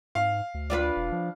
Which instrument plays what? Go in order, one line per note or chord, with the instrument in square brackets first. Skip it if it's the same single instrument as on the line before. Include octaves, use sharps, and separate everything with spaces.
[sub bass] G#2 [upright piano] F5
[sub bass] D2
[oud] D4 F4 B4
[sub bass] E1
F3